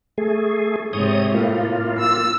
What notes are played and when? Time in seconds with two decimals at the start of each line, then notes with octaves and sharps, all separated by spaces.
0.18 A3 G#4
0.93 G#2 C3 C#5 D#6
1.34 A2 A#3 F4
1.99 E6